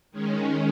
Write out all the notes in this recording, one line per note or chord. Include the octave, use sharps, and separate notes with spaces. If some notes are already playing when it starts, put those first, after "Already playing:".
D#3 G#3 C#4